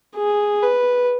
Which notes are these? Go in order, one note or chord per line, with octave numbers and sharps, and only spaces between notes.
G#4
B4